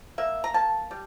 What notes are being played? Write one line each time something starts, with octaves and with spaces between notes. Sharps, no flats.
A#3 E5
A#5
A#3 A5
G3